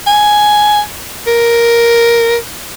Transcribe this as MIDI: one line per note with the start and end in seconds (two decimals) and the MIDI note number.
0.07 0.80 80
1.27 2.36 70